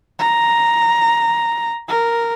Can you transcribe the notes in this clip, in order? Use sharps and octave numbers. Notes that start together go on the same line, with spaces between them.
A#5
A#4